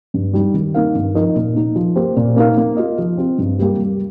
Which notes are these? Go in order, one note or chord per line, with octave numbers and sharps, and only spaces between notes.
G2
G3 D#4 G4
D#3
A#3 D#4 A#4 F5
G2
F3 D#4 A#4 D#5
A#2
A#3 D#4
F3
A#3 G4 C5
A#2
A#3 D#4 A#4 F5
A#3
F4 D#5
F3
C4 F4
G2
G3 A#3 G4
G3